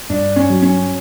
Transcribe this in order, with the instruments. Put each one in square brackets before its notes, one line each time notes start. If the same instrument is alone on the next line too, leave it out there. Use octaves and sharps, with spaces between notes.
[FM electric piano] G2 [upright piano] D4
[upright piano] C#4
[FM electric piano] F#3
[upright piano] C#4